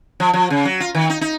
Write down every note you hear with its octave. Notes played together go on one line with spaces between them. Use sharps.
F3
F3
C#3
F#3
F4
D#3
D#4
D#4